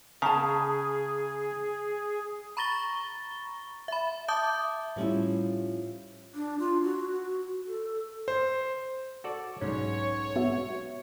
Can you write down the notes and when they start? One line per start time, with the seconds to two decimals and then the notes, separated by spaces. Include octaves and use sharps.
0.22 C#3 G#4 A5 A#5
2.57 A#5 B5 C#6 A6 A#6 G7
3.88 E5 B5
4.28 E5 A5 D6 D#6 G6
4.96 A2 F3 G3 C#4 E4
6.35 D4
6.59 F4
6.83 F#4
7.67 A4
8.28 C5
9.24 F#4 A4 D5
9.61 B1 G#2 C#4 C#5
10.36 B3 F#4 E5